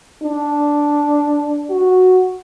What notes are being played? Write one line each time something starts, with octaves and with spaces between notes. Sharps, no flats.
D4
F#4